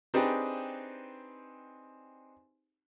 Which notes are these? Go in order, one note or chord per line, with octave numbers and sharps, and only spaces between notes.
C4 D4 D#4 G4 G#4 B4